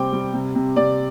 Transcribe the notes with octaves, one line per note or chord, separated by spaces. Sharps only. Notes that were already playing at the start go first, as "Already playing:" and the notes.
Already playing: C3 G3 C4 G5 D6
G3
C3
C3
C3 D5